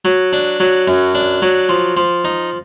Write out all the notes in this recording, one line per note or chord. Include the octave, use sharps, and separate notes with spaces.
F#3
D4
F#3
F#2
D4
F#3
F3
F3
D#4